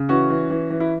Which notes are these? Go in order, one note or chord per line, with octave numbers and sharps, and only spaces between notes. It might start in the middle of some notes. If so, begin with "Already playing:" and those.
Already playing: C#3
E3 C#4 F#4
E3
E3
E3
E4